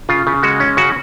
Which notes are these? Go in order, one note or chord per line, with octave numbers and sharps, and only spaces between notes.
C#3 F4
C#3
G#3 F#4
C#4
C#3 F#4